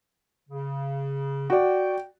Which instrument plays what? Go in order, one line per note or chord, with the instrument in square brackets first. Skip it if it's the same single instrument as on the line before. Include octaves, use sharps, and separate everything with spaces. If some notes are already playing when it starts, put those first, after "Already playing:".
[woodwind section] C#3
[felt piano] F#4 D5 [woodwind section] G5